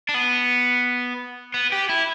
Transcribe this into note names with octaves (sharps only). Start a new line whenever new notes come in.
D4
B3
B3
G4
E4